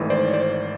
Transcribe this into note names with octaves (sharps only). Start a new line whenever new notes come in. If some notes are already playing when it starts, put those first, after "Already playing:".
Already playing: G#1 G#2 E3 A3
C5 D5
C#5
C5 D5